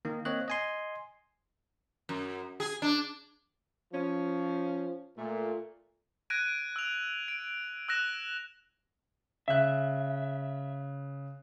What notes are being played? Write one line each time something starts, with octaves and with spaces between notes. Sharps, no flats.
D#3 A#3
A#3 C4 C#5 D#5 F#6
D#5 G#5 C6
F#2
G#4
D4
F3 C#4
A#2 A3
F#6 G#6 A#6 D7 D#7
E6 F7
D7
E6 F#6 A#6 E7 F7
C#3 E5 F#6